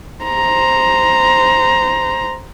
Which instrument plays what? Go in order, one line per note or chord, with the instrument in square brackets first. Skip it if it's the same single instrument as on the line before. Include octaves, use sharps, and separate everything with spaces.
[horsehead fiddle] C5 A#5